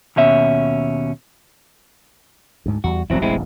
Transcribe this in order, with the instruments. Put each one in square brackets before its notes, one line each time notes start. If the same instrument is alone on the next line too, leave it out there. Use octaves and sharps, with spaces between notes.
[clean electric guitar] D#2 B2 C#4 E5
[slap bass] D2 G#2
[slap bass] E2 G3 [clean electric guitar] F#4
[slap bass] E1 A1 G2 [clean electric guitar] F#3 C4 E4
[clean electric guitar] G#3 C4 E4